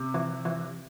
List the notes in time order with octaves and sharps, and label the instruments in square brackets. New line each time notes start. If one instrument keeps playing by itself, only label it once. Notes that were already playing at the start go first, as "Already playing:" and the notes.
Already playing: [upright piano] C3
[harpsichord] E3
E3